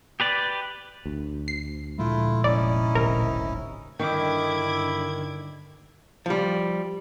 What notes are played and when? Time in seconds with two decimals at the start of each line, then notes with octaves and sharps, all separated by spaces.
0.20 G4 B4 D5
1.06 D2
1.48 C7
1.98 A#2 F3 G#3 A3 E4 F4
2.44 F1 C#4 D#4 E4 D5
2.95 D1 G#1 C3 A#4
4.00 G2 D3 D#3 E4 D#5 G5 D6 G#6
6.26 F3 G3